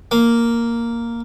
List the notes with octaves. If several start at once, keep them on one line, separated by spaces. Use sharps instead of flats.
A#3